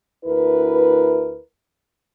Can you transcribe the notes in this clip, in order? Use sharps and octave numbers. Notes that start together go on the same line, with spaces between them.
D2 E4 A#4 B4